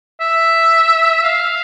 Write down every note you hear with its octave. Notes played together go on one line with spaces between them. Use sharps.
E5
F5